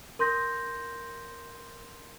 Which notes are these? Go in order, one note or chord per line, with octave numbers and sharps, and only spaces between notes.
A#4 C6 G6 A#6